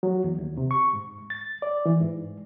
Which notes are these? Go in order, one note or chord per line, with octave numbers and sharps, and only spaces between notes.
F#3
E2
D#2
C3
C#6
G#2
A6
D5
E3
G#2